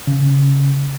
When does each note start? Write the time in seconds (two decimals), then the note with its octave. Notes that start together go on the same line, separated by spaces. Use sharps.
0.07 C#3